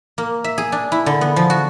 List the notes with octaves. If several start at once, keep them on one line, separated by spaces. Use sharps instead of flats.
A#3
E5
G#4
D4
E4
D3
B3
F3
F#4